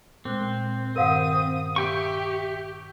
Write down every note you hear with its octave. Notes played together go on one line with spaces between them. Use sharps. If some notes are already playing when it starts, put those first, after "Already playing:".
A#2 G#3 C4 F#6
G2 D#3 A#4 F5 F#5 D#6
G4 E5 G5 C#6